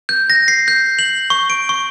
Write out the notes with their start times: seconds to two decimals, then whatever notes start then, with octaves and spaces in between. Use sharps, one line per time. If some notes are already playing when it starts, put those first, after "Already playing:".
0.09 G6
0.30 A#6
0.48 C7
0.68 G6
0.99 F#7
1.30 C#6
1.50 D7
1.69 C#6